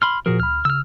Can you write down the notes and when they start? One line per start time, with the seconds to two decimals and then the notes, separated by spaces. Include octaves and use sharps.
0.02 B5 C6 F6
0.26 A#2 F3 F#4 G#4 A#4
0.40 D2 B5 F6
0.65 C#3 E6 F6